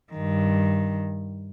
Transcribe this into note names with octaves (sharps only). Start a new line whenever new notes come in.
G2 D#3